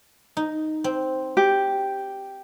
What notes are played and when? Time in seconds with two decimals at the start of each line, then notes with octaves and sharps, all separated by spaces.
0.37 D#4
0.84 C4
1.37 G4